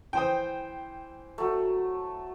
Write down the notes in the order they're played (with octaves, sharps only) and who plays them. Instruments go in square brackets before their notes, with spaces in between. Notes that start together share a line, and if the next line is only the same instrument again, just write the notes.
[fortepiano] E3 C5 D#6 [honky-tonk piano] G5
[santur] F#3 A3